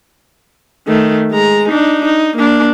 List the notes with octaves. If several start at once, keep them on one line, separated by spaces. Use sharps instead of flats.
D#3 A3
G#3 A#5
D4 D#4
D#4
A#3 D4